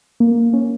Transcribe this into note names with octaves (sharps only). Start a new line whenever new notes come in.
A#3
C#4